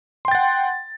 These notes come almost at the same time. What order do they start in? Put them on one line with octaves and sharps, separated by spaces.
C6 G5 A6 F#5